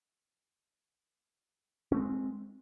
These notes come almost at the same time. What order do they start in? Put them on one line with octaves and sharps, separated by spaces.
C#4 A3 C4 G#3